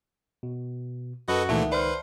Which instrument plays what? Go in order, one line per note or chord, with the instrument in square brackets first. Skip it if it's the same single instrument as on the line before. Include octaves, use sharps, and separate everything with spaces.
[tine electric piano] B2
[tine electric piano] F#2 [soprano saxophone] F#4 [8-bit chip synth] A4 B4 D#5 [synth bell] B5
[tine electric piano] C#2 D#3 [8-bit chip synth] A#2 E3 A3 [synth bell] E5 F#5 A5
[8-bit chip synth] B4 [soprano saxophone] C5 [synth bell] D5 F6